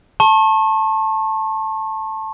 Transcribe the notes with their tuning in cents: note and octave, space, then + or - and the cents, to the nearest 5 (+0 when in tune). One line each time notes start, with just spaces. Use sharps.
A5 +0 C#6 -40